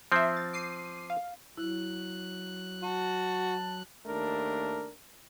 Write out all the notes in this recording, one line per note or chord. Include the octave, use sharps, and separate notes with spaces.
F3 C4 E5 C7
A6
D6 C7 D#7
F5
F#3 E4 F#6
F#4 A5
D#2 A3 D4 A#4